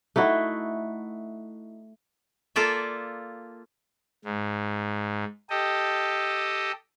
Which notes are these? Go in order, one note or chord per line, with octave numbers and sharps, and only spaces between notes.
A3 D#4 E4 F#4
A#3 F4 A4 D5 E5
G#2
G4 A4 D#5